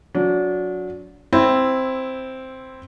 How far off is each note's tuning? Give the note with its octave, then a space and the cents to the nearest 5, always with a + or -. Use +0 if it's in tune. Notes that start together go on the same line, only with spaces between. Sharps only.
F#3 -20 D4 -30
C4 +0 E4 +0